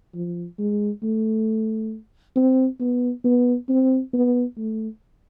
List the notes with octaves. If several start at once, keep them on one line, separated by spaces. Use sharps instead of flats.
F3
G#3
A3
C4
B3
B3
C4
B3
A3